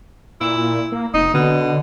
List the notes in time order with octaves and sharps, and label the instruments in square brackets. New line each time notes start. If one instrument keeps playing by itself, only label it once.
[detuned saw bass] A#2 [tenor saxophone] E4
[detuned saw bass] A#3
[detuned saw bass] F1 [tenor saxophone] D#4
[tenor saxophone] B2 [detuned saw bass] D3